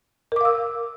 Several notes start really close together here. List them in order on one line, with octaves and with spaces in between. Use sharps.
A#4 D6 F5 E6